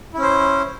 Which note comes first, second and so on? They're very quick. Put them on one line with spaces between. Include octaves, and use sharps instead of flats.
E4 C#4 C5